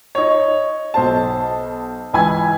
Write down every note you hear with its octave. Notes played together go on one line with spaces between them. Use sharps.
D#4 C#5
B1 C5 A5
C#2 E3 G#5 B5 G#6